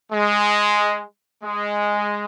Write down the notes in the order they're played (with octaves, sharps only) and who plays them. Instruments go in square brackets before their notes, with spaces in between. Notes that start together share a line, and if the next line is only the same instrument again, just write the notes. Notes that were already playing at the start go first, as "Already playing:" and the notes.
[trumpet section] G#3
G#3